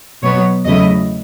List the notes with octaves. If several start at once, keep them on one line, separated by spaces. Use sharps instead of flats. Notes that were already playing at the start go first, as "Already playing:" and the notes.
B2 F#3 B3 C#5
E2 C#3 F#3 A3 E4 D#5